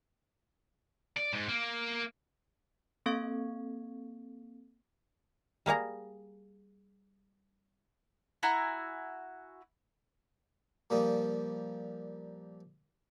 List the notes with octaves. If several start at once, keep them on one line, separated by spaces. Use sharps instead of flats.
D5
G#2
A#3
A#3 C4 A4 F5 C#6 G#6
G3 A#3 G#4 A#5
E4 F#4 G#5 A#5
A#2 F3 G3 A#3 D#6